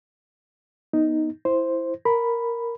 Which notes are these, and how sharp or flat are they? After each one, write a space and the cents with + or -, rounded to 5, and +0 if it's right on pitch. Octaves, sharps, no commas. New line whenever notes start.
B3 -20 D#4 +0
E4 +5 C5 +0
A#4 +0 B5 +0